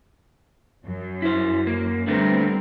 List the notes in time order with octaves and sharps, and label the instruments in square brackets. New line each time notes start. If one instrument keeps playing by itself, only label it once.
[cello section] F#2
[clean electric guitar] E4 C5
A#3
[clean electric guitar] D3 A3 B3 [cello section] G3 C4 A#4